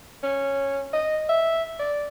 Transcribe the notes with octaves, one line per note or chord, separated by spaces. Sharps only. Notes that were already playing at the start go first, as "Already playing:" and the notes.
C#4
D#5
E5
D5